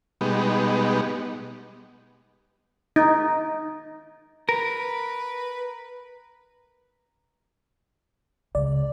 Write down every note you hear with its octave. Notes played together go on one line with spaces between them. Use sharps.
B2 G3 G#3 B3 D#4
D#4
A#4 B4
C#2 D5